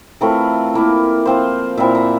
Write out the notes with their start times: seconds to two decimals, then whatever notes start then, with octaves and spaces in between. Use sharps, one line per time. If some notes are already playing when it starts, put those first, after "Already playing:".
0.21 E3 A3 C4 F4 A#4
0.74 E3 A#3 E4
1.26 F3 C4 F4 C5
1.77 A#2 F3 C4 E4 E5
1.95 A#5